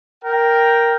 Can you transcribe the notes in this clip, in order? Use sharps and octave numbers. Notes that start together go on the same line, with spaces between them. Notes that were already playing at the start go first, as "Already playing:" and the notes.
A#4 G5